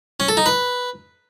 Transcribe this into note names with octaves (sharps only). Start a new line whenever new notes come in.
C#4
A4
D#4
B4